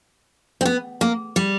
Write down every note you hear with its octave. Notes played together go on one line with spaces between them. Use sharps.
C4
B3
A#3
G3